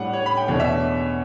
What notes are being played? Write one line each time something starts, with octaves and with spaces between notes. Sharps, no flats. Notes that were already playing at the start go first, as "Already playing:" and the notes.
Already playing: A2 G3 D4 C#5 F#5
C#5
B5
G5
E2 B2 A3 D4 C#5
E5